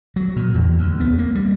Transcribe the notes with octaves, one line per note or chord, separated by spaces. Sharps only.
F#3
A#2
E2
D2
B3
A#3
G3